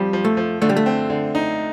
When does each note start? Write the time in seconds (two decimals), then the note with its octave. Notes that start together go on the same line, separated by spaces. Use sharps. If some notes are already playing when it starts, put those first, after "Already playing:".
Already playing: F3 G3 C4
0.13 F3
0.25 A3
0.37 F3
0.61 D3 A3
0.70 G3
0.76 A3
0.86 C4
1.10 D3
1.35 D#4